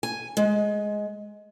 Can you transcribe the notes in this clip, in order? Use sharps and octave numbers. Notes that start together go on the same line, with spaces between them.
G#5
G#3